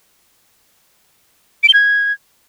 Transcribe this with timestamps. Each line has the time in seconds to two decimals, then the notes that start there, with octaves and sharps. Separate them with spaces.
1.63 D7
1.68 G7
1.74 G#6